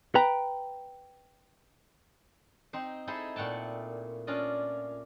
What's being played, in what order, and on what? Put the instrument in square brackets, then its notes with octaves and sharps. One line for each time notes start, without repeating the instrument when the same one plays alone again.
[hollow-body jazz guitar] B4 G5 A#5
[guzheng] C4 D#4 C5
D#4 E4 G#4 A4 C5
A#2 A3 F#5 G5 A5
C#4 D4 F4 D5 D#5